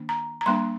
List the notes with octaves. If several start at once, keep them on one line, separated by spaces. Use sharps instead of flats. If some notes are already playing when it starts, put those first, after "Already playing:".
Already playing: D#3 A#3 D4
A#5
A#5
G3 A#3 D4 C6